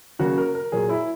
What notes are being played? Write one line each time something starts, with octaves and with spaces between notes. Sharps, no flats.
C#3 F#3 A#3 F#4
A#4
A#4
A#2 F#3 A#3 G#4
E4